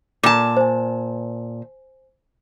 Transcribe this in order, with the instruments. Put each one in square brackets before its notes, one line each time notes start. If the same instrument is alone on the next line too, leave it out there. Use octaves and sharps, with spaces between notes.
[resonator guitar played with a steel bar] A#2 A5 [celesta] D6
[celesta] C5 G#5